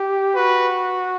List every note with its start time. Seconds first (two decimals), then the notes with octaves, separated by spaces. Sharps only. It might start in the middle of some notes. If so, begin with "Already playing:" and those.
Already playing: G4
0.36 F#4 B4